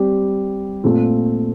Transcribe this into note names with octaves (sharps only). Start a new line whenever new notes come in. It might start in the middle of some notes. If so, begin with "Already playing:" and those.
Already playing: G3 C4 G4
A#2 A3 C4 F4